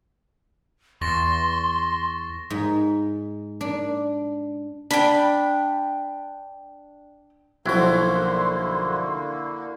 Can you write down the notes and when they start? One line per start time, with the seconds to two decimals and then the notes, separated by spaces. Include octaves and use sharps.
1.01 E2 C6 C#6 A6 A#6
2.50 G#2
3.61 D4
4.91 D4 G5 B5
7.66 B1 D3 F3 A#3 E4 F#4 C6